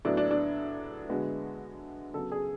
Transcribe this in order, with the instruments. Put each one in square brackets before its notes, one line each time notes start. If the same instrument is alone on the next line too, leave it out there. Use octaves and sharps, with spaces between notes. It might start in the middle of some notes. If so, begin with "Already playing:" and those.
[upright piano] A2 F#3 B3 D4
D4
D4
D3 G#3 B3 F#4
C#3 F#3 B3 A4
G#4